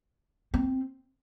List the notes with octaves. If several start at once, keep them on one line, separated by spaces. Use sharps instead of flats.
C4